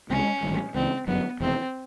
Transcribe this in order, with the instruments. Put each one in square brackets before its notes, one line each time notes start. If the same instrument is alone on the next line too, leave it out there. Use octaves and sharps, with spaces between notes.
[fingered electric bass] C#2 C3 D#3 G#3 [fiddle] C#4
[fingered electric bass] A1 G2 D#3 G3
[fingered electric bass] C#2 C#3 E3 [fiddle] C4
[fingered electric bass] G1 F#2 D3 F#3 [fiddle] B3
[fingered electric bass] F1 E2 B2 [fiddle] C4